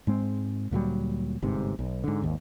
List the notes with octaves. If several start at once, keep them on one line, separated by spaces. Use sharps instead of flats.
G#2 G#3 C4
D2 A#2 F#3 G3
G1 G#2 C3
B1
G#2 D3
G#1 D#2